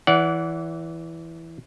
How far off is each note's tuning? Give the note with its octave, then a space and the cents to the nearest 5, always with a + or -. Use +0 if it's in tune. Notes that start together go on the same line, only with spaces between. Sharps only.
E3 +0 D5 -35 F#5 +0